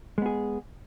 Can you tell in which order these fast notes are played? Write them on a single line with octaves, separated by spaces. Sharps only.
G#3 B3 G#4